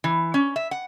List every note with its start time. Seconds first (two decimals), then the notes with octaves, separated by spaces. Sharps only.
0.04 E3
0.34 C#4
0.56 E5
0.71 F#5